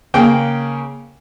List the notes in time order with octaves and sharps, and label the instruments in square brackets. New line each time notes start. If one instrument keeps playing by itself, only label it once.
[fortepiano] C#3 A#3 G5